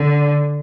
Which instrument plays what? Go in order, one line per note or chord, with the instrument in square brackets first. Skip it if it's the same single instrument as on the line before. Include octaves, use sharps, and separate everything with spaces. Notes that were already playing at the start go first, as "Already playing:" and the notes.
Already playing: [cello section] D3